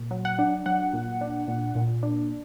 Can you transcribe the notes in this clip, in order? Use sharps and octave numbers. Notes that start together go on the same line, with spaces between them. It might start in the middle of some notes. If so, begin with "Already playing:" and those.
Already playing: A#2
F#3
F#5
D4
F#3 F#5
A#2
D4
A#2
A#2
D4